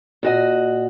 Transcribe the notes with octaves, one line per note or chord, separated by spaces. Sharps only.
A#2 F#4 D#5